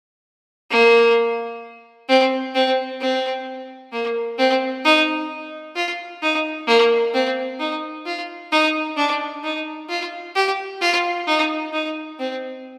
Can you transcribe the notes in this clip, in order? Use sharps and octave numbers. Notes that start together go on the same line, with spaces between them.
A#3
C4
C4
C4
A#3
C4
D#4
F4
D#4
A#3
C4
D#4
F4
D#4
D4
D#4
F4
G4
F4
D#4
D#4
C4